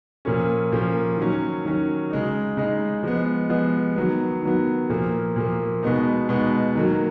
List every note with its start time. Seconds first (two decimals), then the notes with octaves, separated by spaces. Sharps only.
0.25 A#2 F3 A#3 C#4
0.72 A#2 F3 A#3 C#4
1.17 D#3 F#3 C#4
1.65 D#3 F#3 C#4
2.11 C#3 G#3 D#4
2.57 C#3 G#3 D#4
3.03 F3 G#3 B3
3.50 F3 G#3 B3
3.96 D#3 F#3 B3
4.42 D#3 F#3 B3
4.90 A#2 F3 A#3
5.36 A#2 F3 A#3
5.83 B2 G#3 B3 D#4
6.29 B2 G#3 B3 D#4
6.75 D#3 F#3 A#3